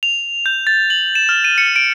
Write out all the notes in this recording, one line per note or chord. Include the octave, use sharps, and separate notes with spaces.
F7
G6
A6
F#7
E7
F6
D#7
C#7
D7